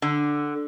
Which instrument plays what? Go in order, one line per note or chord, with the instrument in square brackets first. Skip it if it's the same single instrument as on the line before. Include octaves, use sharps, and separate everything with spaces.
[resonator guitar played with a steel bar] D3